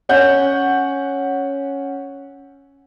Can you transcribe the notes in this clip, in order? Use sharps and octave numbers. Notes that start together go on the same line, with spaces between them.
C#4 F#5 G6